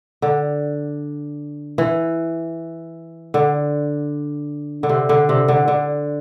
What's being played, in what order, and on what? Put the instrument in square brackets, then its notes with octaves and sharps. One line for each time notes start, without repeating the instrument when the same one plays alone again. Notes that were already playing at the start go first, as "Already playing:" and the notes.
[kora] D3
E3
D3
D3
C3
D3
C3
D3
D3